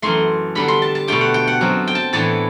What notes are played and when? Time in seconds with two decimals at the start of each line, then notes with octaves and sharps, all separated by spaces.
0.02 F#2 E3 A3 C6
0.55 D3 G3 B3 D4 B5
0.68 C6
0.82 A5
0.95 A5
1.07 B2 A3 D4 G5
1.21 F#5
1.34 G5
1.47 F#5
1.61 F#2 F#3 C4
1.87 G5
1.95 A5
2.13 A2 E3 B3 D4 A5